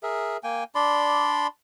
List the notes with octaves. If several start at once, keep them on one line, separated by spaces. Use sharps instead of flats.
G#4 A#4 E5
A#3 G5 G#5
D4 D5 B5 C6